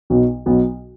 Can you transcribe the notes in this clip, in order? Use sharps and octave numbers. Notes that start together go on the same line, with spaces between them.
B1 B2 F#3 B3
B1 B2 F#3 B3